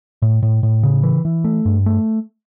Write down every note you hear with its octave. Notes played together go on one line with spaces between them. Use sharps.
A2
A2
A2
C#3
E3
E3
A3
G2
A3